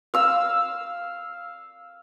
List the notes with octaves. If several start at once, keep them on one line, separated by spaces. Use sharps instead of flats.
F5 E6